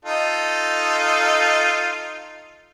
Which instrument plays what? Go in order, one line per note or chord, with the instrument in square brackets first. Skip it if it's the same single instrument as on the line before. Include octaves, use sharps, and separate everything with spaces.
[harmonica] D#4 F4 A4